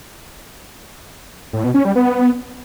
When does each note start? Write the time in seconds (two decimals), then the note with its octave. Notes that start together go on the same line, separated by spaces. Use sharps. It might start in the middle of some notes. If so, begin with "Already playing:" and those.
1.53 A2
1.64 B2
1.74 C#4
1.85 G3
1.96 B3